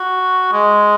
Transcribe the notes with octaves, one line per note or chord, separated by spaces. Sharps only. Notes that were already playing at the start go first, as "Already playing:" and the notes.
Already playing: F#4
G#3